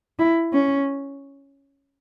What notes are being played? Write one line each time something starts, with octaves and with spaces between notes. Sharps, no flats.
E4
C#4